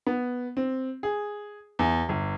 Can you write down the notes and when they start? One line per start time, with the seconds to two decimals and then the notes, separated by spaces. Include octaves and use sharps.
0.07 B3
0.57 C4
1.03 G#4
1.79 E2
2.09 G1